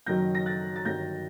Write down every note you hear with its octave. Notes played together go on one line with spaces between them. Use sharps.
F#1 F#2 D#3 F#3 G6 A#6
A#6
F#6 A6
A6
G1 G2 D#3 F#3 G6 A#6